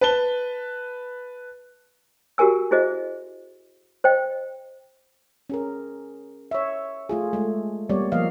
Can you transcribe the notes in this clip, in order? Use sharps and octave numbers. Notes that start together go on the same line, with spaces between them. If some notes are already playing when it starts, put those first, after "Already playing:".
B4 A5 G7
F#4 G4 A#4 G#5 E6
E4 F#4 G#4 C5 D#5 E5
C5 D#5 G5
C#4 G#4 A#4
C#5 E5
A3 F4 G#4
G#3 A3
G3 A#3 B3 C#5 D5
F3 A#3 D#5 F5